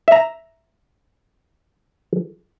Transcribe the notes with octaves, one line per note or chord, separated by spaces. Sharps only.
E5 A#5